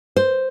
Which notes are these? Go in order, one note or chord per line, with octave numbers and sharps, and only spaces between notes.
C5